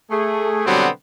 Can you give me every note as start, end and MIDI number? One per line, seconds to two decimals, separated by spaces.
0.10 0.61 57
0.10 0.61 68
0.65 0.88 47
0.65 0.88 50
0.65 0.88 54
0.65 0.88 55
0.65 0.88 59
0.65 0.88 60